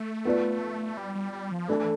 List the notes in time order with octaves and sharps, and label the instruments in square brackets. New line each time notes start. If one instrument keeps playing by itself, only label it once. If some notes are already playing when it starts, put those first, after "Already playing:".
Already playing: [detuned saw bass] A3
[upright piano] B3 F4 B4 D5
[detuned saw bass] G3
G3
G3
F3
[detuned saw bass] E3 [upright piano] A3 D4 A4
[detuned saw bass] E3